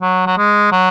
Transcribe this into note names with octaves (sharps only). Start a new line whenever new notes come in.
F#3
F#3
G#3
F#3